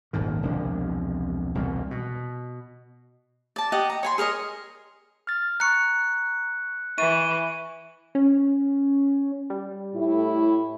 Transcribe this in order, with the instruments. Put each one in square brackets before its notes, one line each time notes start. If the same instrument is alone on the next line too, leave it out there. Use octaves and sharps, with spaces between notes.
[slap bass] D#1 G#1 G#2 D#3
E1 C2 F3 D4
E1 C2 A#2
B2
[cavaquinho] D5 A5
G4 D#5 F#5 D#6
A#5
C#5 G#5 C6
G#4 A#4 C#5 D#5
[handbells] F6 A6
[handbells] A#5 C#6 [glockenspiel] F#6 C#7
[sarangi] E3 [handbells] C#6 [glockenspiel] D#7
[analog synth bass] C#4
G3
[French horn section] A2 E4